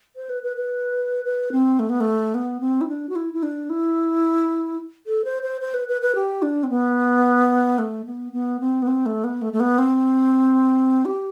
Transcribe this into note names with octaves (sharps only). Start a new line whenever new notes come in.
C5
B4
B4
B4
B4
C4
A3
B3
A3
B3
C4
E4
D4
F#4
E4
E4
D4
E4
A4
C5
C5
C5
B4
B4
B4
G4
D4
C4
B3
A3
B3
B3
C4
B3
C4
A3
B3
A3
A3
B3
C4
G4